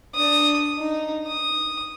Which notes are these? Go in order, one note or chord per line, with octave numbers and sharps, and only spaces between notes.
D4 D#6
D#4
D#6